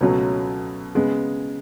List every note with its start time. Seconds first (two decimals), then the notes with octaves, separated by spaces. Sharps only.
0.01 C#2 B2 F#3 A3 C#4
0.95 C#3 G#3 B3